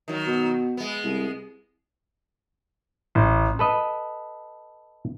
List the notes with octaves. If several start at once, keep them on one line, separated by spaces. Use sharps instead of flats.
D#3 F#3
B2
G#3 B3
C2
A1
A4 B4 D#5